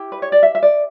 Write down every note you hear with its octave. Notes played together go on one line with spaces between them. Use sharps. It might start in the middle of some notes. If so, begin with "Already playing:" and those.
Already playing: E4 G4
B4
C#5
D5
E5
E5
D5